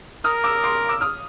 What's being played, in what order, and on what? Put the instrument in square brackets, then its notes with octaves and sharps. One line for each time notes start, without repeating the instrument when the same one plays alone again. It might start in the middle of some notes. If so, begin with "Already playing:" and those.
[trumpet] A#4 [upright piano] D#6 F6
[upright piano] D6 E6
C6 D6
D6 E6
D#6 F6